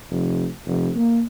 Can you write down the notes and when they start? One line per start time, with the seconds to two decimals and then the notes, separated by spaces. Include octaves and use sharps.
0.11 F1
0.67 F1
0.95 A#3